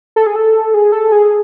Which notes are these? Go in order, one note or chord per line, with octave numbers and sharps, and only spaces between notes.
A4
G#4
A4
G#4
A4
G#4